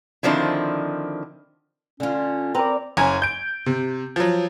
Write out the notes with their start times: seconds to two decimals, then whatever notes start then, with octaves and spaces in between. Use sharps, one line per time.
0.23 D3 D#3 F3 C4 D4 E4
2.00 D3 C#4 F4
2.55 C4 A#4 B4 D5 A#5
2.97 F#1 C#4 G#5 A#5 G#6
3.22 G6 D7
3.66 C3
4.16 F3 F#3